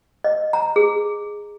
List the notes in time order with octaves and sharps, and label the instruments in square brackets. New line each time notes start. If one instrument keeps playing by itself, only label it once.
[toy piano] D#5
A#5
G#4